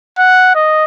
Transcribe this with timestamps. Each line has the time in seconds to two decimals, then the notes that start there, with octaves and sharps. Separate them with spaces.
0.18 F#5
0.55 D#5